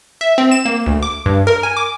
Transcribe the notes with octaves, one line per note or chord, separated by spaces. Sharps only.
E5
C4
E7
A#3
D2
D6
G2
A#4
G#5
D6